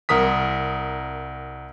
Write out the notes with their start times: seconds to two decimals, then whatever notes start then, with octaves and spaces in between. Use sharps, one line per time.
0.09 C2 A#4 D#6 B6